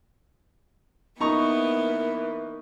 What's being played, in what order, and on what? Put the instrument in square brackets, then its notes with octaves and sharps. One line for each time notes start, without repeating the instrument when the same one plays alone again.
[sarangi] E3 [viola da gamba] A#3 B3 [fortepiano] D#4 A#5 C#6 [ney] A#4